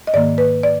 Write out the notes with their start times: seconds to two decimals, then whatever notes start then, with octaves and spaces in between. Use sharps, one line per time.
0.07 D#5
0.14 G#2 D#3 A#3 D5
0.38 B4
0.63 D5